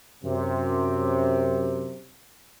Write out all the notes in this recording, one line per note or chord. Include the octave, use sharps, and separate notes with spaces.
F#2 C3